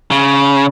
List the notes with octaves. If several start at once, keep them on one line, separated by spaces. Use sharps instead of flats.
C#3